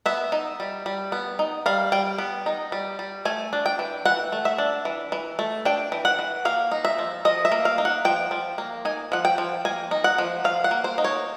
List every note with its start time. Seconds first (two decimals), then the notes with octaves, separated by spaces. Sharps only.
0.06 B3 E5
0.32 D#4
0.60 G3
0.86 G3
1.12 B3
1.39 D#4
1.66 G3 F5
1.92 G3 G5
2.18 B3
2.46 D#4
2.72 G3
2.99 G3
3.25 A3 G#5
3.53 D4
3.66 G5
3.79 E3
4.05 E3 F#5
4.32 A3
4.45 E5
4.58 D4
4.85 E3
5.12 E3
5.39 A3
5.65 D4 G5
5.92 E3
6.05 F#5
6.19 E3
6.45 A#3 F5
6.72 D#4
6.85 E5
6.99 F3
7.25 F3 D#5
7.45 E5
7.52 A#3
7.65 F5
7.78 D#4
7.85 F#5
8.05 F3 G5
8.31 F3
8.58 A#3
8.85 D#4 G#5
9.12 F3 F#5
9.25 G5
9.38 F3
9.65 A#3 G#5
9.91 D#4
10.04 F#5
10.18 F3
10.44 F3 F5
10.64 F#5
10.71 A#3
10.84 C5
10.98 D#4
11.04 C#5